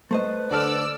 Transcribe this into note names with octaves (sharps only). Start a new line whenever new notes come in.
A3 B4 C5 D#5
D3 A4 D5 E6 F6